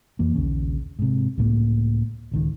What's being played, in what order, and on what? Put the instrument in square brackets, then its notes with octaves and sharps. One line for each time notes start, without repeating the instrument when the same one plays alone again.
[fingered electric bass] F2 E3 A#3
D#1 A#1 D#2 C#3
G#2 C3
C#2 A2 G#3 A#3
D1 C#2 D#3